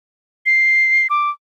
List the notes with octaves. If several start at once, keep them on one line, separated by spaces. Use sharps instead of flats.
C7
D6